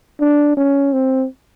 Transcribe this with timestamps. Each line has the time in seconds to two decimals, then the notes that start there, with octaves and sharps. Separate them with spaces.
0.21 D4
0.57 C#4
0.93 C4